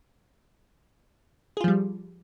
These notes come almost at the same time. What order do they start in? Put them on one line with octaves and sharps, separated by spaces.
G#4 F4 F3 G3